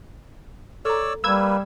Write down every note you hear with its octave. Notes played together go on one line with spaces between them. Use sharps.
A4 C#5 D5 A#5 E6
G3 A#3 B4 E6 G#6